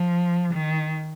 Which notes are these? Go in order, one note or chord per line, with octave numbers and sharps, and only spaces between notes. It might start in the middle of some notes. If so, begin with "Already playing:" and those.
Already playing: F3
D#3